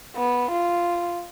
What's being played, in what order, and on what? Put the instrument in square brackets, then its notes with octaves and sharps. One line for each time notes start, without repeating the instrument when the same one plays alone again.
[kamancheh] B3
F4